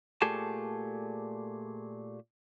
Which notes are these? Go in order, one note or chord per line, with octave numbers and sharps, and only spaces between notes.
A#2 A3 G4 G#4 A5